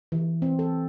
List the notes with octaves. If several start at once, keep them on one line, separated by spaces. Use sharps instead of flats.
E3
C4
A4